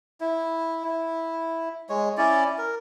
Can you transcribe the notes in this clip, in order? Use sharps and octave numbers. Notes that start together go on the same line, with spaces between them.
E4
E4
G#3 C#5
C#4 E4 D5
A#4